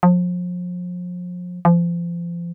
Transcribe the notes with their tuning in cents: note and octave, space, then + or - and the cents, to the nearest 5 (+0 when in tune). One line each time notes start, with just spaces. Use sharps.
F3 +35
F3 -30